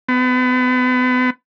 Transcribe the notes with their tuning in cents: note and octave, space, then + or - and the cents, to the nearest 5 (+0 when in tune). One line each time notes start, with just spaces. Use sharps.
B3 +35